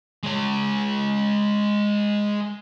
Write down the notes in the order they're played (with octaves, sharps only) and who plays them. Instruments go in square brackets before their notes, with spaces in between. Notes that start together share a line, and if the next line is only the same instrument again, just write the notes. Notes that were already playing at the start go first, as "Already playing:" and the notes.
[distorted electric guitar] G#3 C#5